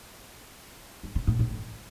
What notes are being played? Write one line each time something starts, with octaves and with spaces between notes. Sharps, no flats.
G2
C#3
A2
A2